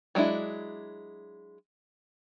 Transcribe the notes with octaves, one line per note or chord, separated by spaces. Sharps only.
F#3 G#3 D4 E4